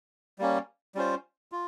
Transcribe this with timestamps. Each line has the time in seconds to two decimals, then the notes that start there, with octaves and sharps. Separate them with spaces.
0.39 G3 A#3 C#4
0.95 G3 C#4 F4 C5
1.52 F4